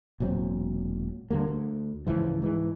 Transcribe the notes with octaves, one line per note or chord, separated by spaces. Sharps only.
E1 A#2 F#3 C4
D3 D#3 G3 A#3
D2
C#2 G#2 E3 F3
G#2 E3 G#3